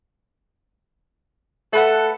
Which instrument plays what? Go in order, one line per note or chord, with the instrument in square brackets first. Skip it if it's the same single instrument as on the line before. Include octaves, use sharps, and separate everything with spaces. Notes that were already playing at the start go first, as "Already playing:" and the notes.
[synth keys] A3 B4 F#5 [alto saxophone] A4